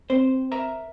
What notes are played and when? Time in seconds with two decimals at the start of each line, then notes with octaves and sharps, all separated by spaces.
0.10 C4 C5 C6
0.52 A#4 E5 A#5